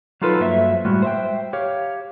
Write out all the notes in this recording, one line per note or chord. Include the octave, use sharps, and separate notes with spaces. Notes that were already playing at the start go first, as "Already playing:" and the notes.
F#3 D#4 F4 A4 B4
G2 F#3 A#3 C5 E5
A2 G3 G#3 F#4
C5 E5 G5
G4 C#5 F5